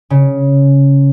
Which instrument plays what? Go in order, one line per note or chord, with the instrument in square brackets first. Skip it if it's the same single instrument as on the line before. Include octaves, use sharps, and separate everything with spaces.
[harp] C#3